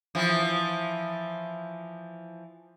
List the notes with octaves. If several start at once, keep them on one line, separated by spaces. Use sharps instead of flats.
E3 F3